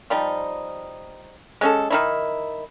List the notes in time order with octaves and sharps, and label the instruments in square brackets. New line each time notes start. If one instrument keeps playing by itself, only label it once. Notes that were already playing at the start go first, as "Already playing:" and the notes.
[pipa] F3 G3 D#4
G#3 C#4 A4
D#3 D#4 E4